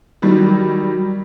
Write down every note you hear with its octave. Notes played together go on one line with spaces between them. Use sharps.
D#3 F#3 G3